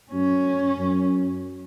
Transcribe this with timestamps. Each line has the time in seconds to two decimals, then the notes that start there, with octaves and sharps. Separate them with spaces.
0.12 F#2 C#4
0.79 F#2